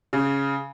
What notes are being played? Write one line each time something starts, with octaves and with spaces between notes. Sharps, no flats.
C#3